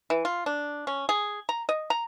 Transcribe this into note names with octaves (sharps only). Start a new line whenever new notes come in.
E3
F4
D4
C#4
G#4
A#5
D#5
A#5